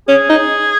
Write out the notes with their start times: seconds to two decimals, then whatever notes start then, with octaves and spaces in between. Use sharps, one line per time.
0.08 C#4 G#4
0.29 D#4